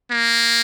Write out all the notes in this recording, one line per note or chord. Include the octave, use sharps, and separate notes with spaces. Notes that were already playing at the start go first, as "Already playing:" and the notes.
A#3